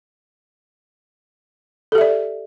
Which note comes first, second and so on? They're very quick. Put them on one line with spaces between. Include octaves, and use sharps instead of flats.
A4 G4 E5 D5